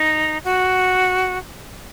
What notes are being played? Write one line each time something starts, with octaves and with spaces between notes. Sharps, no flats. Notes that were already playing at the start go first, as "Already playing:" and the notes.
Already playing: D#4
F#4